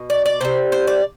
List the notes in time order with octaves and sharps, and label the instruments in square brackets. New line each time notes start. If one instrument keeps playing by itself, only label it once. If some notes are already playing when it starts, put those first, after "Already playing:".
Already playing: [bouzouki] B2
D5
D5
C3 G3 C5
C5
D5